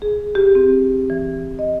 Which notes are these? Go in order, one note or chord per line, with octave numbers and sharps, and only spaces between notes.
G#4
G4
C4
E3
D#5